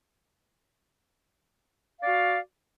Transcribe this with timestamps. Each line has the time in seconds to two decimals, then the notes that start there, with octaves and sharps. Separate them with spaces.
1.99 F5
2.03 D5
2.07 F#4